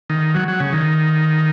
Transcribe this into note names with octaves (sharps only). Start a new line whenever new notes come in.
D#3
F#3
F#3
C#3
D#3